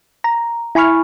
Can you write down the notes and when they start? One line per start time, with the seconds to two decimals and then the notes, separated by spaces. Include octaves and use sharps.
0.24 A#5
0.75 E4 G#5 B5 C#6 F6